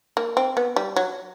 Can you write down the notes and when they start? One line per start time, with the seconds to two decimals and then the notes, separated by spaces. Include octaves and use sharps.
0.17 A#3
0.37 C4
0.57 B3
0.76 G3
0.96 F#3